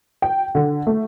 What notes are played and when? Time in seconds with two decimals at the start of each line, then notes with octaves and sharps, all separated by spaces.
0.22 G5
0.55 D3
0.87 A3